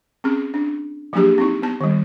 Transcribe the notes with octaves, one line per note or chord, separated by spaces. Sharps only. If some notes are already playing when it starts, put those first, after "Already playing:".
C4 C#4 G#4
D4
F3 F#3 A#3 D4 G4 G#4
C4 D#4 E4
B3 A5
D#3 G3